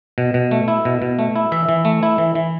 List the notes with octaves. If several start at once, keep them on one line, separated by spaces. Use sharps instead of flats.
B2
B2
A3
E4
B2
B2
A3
E4
E3 E5
E3
A3
E4
E3
E3